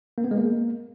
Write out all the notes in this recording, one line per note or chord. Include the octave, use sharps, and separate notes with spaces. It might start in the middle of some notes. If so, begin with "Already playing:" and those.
A#3
B3
G#3
A#3